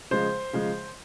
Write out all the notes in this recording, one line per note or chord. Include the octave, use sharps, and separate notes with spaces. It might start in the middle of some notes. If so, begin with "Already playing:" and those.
C#3 F3 G#3 C5
C#3 F3 G#3